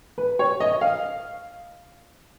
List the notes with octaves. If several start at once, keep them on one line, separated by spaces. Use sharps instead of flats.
B4
C#5
D#5
F5